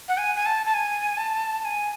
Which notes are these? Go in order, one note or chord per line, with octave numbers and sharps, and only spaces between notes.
F#5
G#5
G#5
A5
A5
G#5
A5
A5
G#5